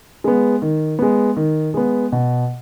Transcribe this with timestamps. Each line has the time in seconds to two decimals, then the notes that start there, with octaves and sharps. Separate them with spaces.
0.24 G#3 B3
0.62 D#3
0.99 G#3 B3
1.37 D#3
1.74 G#3 B3
2.12 B2